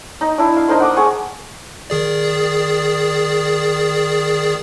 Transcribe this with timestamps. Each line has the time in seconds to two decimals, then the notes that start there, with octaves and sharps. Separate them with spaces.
0.21 D#4
0.38 D4 E4
0.56 F5
0.68 D4 D#4 A#4 C5
0.80 F#5 D6 D#6
0.96 G#4 F#5 C#6
1.90 D#3 G#4 D5